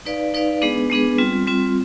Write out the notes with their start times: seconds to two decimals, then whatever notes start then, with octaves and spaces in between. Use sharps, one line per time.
0.06 D#4 B4 D5 F5
0.34 D#4 B4 D5 F5
0.62 G#3 B3 D4 G#4 B4
0.90 G#3 B3 D4 G#4 B4
1.18 G3 C4 F4
1.47 G3 C4 F4